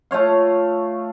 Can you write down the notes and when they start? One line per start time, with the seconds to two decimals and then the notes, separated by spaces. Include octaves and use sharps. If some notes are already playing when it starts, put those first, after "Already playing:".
0.11 A3 F4 C#5 F5